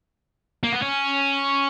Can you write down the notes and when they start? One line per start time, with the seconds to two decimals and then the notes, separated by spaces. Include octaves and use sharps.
0.64 A#3
0.73 B3
0.83 C#4